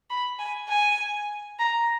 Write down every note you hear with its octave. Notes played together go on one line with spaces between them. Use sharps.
B5
G#5
G#5
A#5